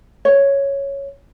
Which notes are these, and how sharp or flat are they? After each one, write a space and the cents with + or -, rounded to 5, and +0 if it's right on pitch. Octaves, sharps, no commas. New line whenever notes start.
C#5 +0